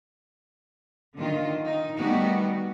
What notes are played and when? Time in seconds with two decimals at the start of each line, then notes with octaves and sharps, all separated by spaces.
1.15 D3 D#3 F4
1.65 D#4
1.97 D#3 G3 A3 B3 D#4 F#4